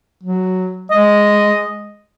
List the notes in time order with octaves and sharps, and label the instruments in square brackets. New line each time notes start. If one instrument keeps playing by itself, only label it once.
[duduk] F#3
[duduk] G#3 [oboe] D#5